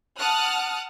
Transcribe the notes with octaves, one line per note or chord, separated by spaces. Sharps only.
F#5 A5 D#6 F6 F#6